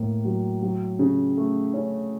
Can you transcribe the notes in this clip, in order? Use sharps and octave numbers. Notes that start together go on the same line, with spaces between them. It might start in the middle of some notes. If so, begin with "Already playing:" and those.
Already playing: A2 A#3
F#3
F#3
C#3
A3
C#4